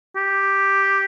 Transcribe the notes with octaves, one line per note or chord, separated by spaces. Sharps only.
G4